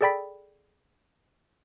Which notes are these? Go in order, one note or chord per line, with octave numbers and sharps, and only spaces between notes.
G#4 A4 D5 G5 B5 B6